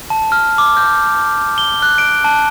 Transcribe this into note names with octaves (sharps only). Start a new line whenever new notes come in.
A5
F6
D6
G6
G7
F#6
D7
A5